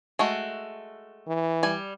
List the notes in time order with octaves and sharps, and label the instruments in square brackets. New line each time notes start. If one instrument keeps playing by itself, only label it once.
[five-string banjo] G#3 A3 F#4
[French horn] E3
[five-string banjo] G3 G#5